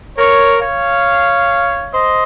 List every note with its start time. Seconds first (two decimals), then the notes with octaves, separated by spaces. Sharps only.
0.18 A#4 C#5
0.61 C#5 F5
1.92 C5 D#5